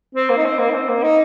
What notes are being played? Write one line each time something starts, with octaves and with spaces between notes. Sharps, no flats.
C4
A#3
D#4
C4
A#3
D#4
C4
A#3
D#4